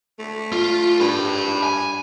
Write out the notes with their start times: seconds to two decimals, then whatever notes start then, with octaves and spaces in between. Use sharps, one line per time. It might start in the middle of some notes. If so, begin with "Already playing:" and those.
0.19 A3
0.52 F4
1.00 G2 A5 B5
1.64 G#5